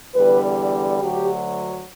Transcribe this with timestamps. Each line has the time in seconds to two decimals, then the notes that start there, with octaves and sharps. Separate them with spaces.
0.15 E2 D3 G3 B4
1.00 D2 D3 F#3 G4